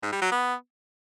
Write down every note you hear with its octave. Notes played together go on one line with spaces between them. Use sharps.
G#2
G3
F#3
B3